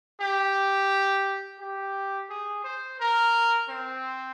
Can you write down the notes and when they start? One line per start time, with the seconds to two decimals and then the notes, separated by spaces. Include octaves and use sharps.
0.20 G4
1.59 G4
2.30 G#4
2.64 C5
2.99 A#4
3.69 C4